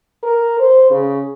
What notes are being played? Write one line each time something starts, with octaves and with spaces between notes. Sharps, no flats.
A#4
C5
C#3